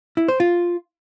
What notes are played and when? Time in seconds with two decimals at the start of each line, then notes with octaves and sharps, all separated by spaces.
0.17 E4
0.29 C5
0.40 F4